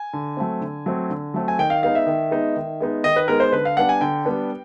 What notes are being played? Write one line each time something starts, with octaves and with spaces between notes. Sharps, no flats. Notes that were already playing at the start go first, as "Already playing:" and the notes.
Already playing: G#5
D3
F#3 A3 C4
D3
F#3 A3 C4
D3
F#3 A3 C4
G#5
D#3 G5
F5
G#3 B3 D#4 F5
E5
D#3
G#3 B3 D#4
D#3
G#3 B3 D#4
D#3 D#5
B4
G#3 B3 D#4 A#4
C5
D3 B4
F5
G3 B3 D4 F#5
G#5
D3 G5
G3 B3 D4